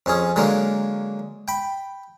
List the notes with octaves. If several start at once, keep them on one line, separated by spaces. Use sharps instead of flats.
F2 C#4 G#4
D3 F#3 G#3 A#3
G5 B5